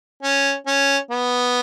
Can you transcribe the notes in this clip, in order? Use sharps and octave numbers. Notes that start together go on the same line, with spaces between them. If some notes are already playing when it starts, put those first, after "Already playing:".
C#4
C#4
B3